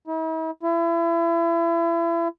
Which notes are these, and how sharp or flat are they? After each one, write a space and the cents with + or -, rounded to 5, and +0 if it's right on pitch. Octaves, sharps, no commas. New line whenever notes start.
E4 -45
E4 +35